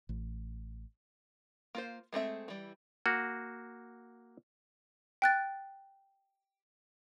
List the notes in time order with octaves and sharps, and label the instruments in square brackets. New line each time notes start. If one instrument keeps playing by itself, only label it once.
[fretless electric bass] A1
[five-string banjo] A#3 F4 C5
G#3 A3 C4 E5
E3 G3
[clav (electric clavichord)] A#3 F#4
[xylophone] G5 F#6 A6